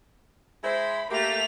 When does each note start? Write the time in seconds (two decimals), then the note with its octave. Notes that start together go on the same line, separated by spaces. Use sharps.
0.64 G#3 E4 C5 B5
1.11 A3 A#3 G4 F7